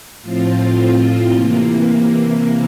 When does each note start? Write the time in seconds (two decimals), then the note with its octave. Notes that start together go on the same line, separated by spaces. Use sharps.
0.21 A2 F3 C4 F4
1.32 C3 E3 A#3